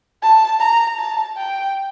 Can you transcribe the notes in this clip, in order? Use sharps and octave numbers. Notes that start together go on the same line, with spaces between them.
A5
A#5
A5
G5